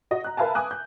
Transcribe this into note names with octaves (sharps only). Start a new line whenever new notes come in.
F#4 D#5
A#5 F#6
A#4 B4 E5 F5 G#5 A5
G#5 D6 D#6 F#6
G6